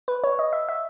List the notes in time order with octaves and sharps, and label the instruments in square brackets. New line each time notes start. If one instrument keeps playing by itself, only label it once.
[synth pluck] B4
C#5
D#5
E5
E5